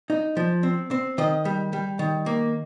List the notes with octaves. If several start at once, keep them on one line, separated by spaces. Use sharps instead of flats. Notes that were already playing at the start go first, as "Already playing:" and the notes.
D#4
F3
C4
C4
D#3 D#5
G3
G3
D#3
A#3